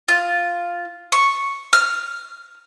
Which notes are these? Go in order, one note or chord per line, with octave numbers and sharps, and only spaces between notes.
F4
C#6
F6